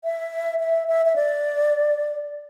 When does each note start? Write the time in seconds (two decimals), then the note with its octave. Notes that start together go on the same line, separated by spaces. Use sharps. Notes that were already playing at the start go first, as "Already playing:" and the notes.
0.04 E5
0.60 E5
0.88 E5
1.06 E5
1.16 D5